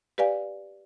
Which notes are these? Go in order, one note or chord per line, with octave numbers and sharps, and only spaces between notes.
G4 B4 D5 F5 G#5